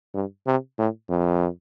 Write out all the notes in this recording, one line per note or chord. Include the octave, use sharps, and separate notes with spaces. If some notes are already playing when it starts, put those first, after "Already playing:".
G2
C3
A2
F2